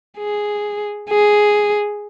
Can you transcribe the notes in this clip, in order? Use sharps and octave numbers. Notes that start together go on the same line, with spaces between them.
G#4
G#4